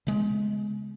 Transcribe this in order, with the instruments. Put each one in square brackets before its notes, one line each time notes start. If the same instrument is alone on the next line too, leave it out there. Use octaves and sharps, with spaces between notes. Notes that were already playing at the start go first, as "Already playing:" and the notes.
[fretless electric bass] C#3 G#3 B3